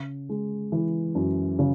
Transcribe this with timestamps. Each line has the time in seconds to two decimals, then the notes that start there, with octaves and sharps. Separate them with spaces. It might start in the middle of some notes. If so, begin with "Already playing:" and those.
Already playing: C#3
0.29 G#3
0.72 E3
1.15 F#2
1.59 C#3